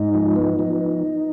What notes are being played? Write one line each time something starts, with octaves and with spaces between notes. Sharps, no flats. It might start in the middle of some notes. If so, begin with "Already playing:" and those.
Already playing: G#2 D#4
F3
B3
F3